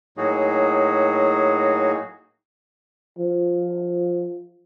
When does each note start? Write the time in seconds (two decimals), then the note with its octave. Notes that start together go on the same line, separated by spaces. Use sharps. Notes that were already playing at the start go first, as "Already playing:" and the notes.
0.17 A2 F#3 A#3 D#4 F#4 G#4
3.19 F3